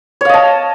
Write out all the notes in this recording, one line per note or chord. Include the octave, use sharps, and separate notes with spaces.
C#5 D#5 F5 A5